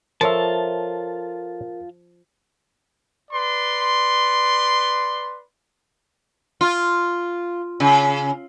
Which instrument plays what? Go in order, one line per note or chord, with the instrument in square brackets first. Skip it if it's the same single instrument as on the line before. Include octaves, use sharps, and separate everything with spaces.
[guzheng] F3 [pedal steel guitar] F4 A5 [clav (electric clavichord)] A4 C#5 E5 [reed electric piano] A#4
[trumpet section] B4 D5 C6
[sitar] F4
C#3